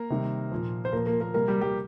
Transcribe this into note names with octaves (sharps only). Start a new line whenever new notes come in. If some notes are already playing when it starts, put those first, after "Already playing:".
Already playing: A#3 A#4
C3 D#3 G3
A#2 F3
C5
A#2 F3 A#3 A#4
A#3 A#4
A#3 A#4
C3 G3 A#3 A#4
G3 G4
G3 G4